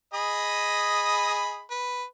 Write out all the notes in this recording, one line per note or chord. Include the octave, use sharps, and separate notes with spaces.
G#4 D#5 B5
B4